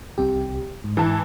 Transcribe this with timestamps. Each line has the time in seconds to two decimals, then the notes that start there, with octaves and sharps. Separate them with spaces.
0.18 C2 C3 G4
0.84 G#2
0.97 E3 A5